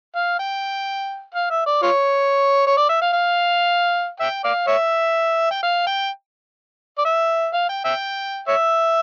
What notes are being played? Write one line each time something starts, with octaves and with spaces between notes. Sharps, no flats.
F5
G5
F5
E5
D5
F4 C#5
C#5
D5
E5
F5
F5
E5 G5
D5 F5
C#5 E5
G5
F5
G5
D5
E5
F5
G5
E5 G5
C#5 E5